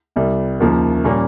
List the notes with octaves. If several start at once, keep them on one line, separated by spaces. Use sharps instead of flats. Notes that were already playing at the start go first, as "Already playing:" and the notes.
C2 C3 G3
D#2 C#3 F3 A#3
A#2 G3 A#3 C#4